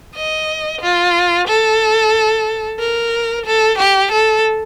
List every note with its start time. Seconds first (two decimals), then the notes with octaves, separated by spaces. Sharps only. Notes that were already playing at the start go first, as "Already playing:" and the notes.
0.16 D#5
0.81 F4
1.48 A4
2.79 A#4
3.46 A4
3.78 G4
4.11 A4